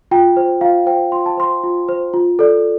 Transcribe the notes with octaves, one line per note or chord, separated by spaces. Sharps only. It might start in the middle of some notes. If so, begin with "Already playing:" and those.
F4 G5
C5
F4 F5
C5 G5
F4 C6
A5
C5 C6
F4
C5
F4
A4 D5